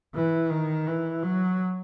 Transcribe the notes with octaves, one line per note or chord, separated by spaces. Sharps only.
E3
D#3
E3
F#3